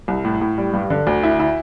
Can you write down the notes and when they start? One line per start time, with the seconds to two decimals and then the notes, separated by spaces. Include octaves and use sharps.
0.08 C2
0.25 A2
0.41 A2
0.58 G3
0.74 G2
0.90 D3
1.07 D2
1.23 E4
1.40 E4